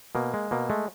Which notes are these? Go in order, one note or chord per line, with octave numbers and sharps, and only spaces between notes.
B2 A#3
G#3
B2 A#3
G#3 A3